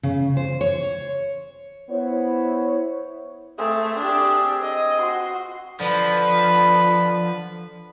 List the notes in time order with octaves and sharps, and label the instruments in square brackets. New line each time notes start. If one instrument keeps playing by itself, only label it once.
[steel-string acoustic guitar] C#3
C5
C#5
[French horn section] B3 E4 C5 C#5
[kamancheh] A3 [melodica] C4 G#4
[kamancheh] D4 G4
D#5
F#4 C6
[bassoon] D3 [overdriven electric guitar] F3 [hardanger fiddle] B4